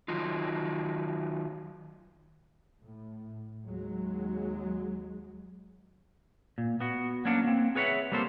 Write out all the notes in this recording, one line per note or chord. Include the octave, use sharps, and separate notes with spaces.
D#3 F#3 D#4 F4
A2
D#2 F#3 G#3
A#2
B3 F#4
F#3 A#3 C#4 D4 F#5
A#3 C4
G#4 B4 C#5 D#5 E5 F#5
G3 A#3 C4 A4 C5